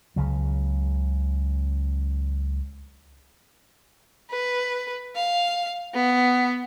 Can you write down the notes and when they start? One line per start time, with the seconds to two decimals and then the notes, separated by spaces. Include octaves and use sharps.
0.16 C#2 C#3 F#3
4.30 B4
5.16 F5
5.94 B3